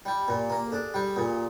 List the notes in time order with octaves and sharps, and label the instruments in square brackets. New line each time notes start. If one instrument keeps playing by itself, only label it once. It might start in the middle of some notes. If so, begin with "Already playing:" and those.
[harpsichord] G3 [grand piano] G4
[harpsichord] A#2 [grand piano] G4
[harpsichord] A#3
[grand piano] A4
[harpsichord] D4 [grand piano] G#4
[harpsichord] G3 [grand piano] G4
[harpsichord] A#2 [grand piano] G#4